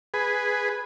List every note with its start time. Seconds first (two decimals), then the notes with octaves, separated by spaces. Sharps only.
0.14 G#4 B4